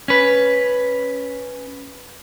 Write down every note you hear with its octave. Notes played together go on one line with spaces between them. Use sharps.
C#4 B4